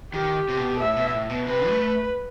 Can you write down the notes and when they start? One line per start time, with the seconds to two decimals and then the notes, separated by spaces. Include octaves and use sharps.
0.14 D#3 G4
0.49 C3
0.57 B2
0.80 A2 E5
0.96 B2
1.13 A2
1.29 B2
1.47 C3 B4
1.68 A3